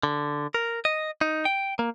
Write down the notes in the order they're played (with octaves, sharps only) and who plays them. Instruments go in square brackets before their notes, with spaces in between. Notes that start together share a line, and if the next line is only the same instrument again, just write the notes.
[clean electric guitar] D3
A#4
D#5
D#4
G5
A#3